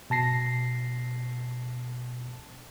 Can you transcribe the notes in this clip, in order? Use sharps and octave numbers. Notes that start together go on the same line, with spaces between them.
B2 A5 A#6 C7